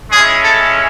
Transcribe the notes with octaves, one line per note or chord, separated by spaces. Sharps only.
G#3 C#4 E4 G#4
A4